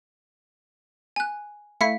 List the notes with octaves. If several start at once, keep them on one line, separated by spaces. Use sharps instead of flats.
G#5 F#6
A3 E4 F5 B6 C#7